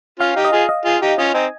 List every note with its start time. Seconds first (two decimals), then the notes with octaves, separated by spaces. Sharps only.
0.20 C#4 F4 F5
0.36 D#4 G4
0.45 D#5
0.52 F4 G#4
0.69 D#5
0.85 F4 G#4
1.02 D#4 G4
1.18 C#4 F4 D#5
1.34 C4 D#4 G#5